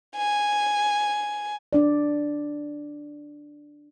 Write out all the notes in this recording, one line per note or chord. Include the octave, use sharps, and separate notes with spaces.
G#5
D4 D5